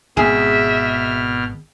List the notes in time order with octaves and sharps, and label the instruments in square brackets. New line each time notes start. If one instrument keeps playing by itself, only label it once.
[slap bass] G#1 [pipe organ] B2 F6 [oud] G#4 [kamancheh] E5